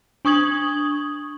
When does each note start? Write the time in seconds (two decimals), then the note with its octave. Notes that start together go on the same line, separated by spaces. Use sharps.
0.25 D4 C#6 D#6 G#6 F#7